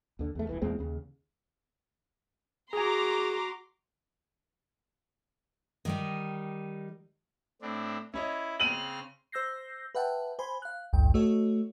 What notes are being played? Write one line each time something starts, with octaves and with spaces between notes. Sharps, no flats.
D#2 D3
E2 A3
D#1 A#1 E3
E2 A#2 G#3 C4
D#2 C#3
F#4 G#4 G#5 A#5 C6 D6
D#3 G3 D#4
A2 C4 D4
C#4 E4 C#5 D#5
C#3 C4 F6 D#7 F#7
C5 E6 G6 A#6 C7
B4 E5 F#5 G5 A5
C5 G#5 B5 C6
F5 F#6
A1 D2 G2 G5
A3 F#4 A4 C#5 D#5